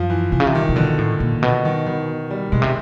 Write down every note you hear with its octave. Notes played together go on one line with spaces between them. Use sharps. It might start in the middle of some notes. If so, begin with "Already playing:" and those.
Already playing: F#2 F3
E3
C3 E3
C#3
C3
D#3
C3
B2 D3
A2
A#2
B2
D#3
D#3
G3
B2 G#3
C3